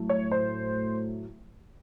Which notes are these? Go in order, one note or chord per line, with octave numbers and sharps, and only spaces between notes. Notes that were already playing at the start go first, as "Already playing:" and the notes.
Already playing: A2 F#3 A3
C#5
C5